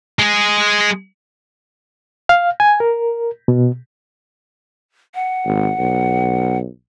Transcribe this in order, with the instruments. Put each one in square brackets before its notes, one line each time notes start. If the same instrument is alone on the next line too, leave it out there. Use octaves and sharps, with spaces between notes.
[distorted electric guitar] G#3 G#4
[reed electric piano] F5
G#5
A#4
B2
[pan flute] F#5
[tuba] G#1
B1